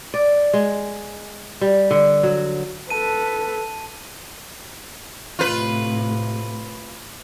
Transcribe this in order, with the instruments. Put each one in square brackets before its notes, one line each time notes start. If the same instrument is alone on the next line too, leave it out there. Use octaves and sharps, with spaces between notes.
[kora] D5
G#3
G3
D3
F#3
[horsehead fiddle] A4 B4 [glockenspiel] A5 D#7
[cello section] A2 C3 [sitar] F4 B4